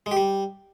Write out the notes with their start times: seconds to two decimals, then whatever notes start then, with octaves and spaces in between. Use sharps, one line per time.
0.06 G#3
0.11 G4
0.17 G3